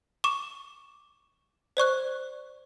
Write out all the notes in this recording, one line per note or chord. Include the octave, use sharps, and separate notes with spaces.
C#6 D6 E7
C5 D5 C#6 F#6